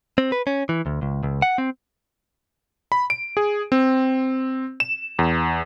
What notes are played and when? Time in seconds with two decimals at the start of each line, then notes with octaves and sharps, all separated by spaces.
0.18 C4
0.32 B4
0.47 C#4
0.69 E3
0.86 D2
1.02 C#2
1.23 C#2
1.42 F#5
1.58 C4
2.92 B5
3.10 D7
3.37 G#4
3.72 C4
4.80 E7
5.19 E2